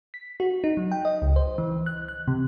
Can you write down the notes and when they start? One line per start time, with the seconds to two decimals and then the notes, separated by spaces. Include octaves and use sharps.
0.14 B6
0.40 F#4
0.64 D#4
0.77 F#3
0.92 G5
1.05 D#5
1.22 C#2
1.36 C5
1.58 E3
1.86 F#6
2.08 F#6
2.28 C3